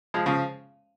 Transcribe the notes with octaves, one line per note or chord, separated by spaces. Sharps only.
F3 G#3
C#3 F3